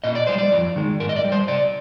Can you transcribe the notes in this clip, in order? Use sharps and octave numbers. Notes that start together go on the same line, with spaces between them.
A#2 D#5
D5
G3 C5
D5
F2
D#3 G#3
G#2 A#4
D#5
D5
G3
C5
C3 D5